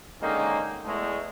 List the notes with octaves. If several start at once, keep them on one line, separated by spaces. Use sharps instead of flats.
D3 D#3 G#3 A#3 C#4 D#4
E2 G#3 A3